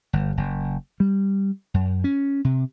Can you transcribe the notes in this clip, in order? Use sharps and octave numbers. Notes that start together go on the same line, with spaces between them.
G1
F#1
G3
F#2
C#4
C3